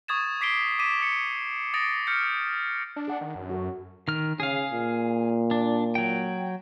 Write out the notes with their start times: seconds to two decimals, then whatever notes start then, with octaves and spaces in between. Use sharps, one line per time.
0.08 C#6 D#6 G#6 A6 E7
0.41 D6 B6 C7 D7 G7
0.79 D6 B6 D#7 E7
1.00 D#6 B6 C#7 D7
1.74 D#6 A6 A#6 C7 D7
2.07 F6 G6 C#7
2.96 D4
3.08 G#4 F#5
3.21 D#3
3.35 F#2
3.50 F#4 A4
4.08 D#3 F6
4.40 C#3 G#4 F5
4.71 A#2
5.51 D4
5.95 F#3 G5